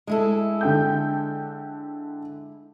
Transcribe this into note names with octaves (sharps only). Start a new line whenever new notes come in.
G#3 E4 A4
D3 G5 G6